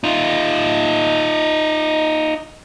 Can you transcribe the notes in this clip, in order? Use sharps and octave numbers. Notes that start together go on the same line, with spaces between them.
D#4 F4